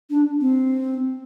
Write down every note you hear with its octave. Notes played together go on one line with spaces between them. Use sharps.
D4
C4